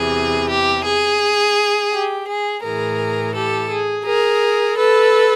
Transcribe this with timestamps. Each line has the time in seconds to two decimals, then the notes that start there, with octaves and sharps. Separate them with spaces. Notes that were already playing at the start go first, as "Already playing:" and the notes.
Already playing: E2 C3 E3 G#4
0.49 G4
0.85 G#4
1.92 G4
2.28 G#4
2.63 A2 E3 G#4 A#4
3.35 G4 A4
3.70 G#4
4.06 G#4 A#4
4.77 A4 B4